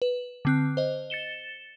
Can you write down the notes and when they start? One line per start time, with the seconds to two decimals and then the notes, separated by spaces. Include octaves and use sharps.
0.02 B4
0.45 D3 C4 F#6
0.77 C5 D#5
1.10 A6 C#7 E7 G7